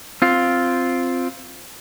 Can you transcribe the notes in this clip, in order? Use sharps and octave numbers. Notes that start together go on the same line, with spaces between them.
C4 F4